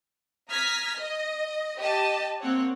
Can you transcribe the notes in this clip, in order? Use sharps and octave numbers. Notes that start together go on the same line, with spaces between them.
A#5 D#6 F6 G#6 B6
D#5
G4 D#5 A5
A#3 C4 C#5 F#5